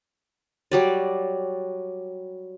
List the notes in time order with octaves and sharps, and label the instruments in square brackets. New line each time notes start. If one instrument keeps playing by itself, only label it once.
[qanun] F#3 G3 D5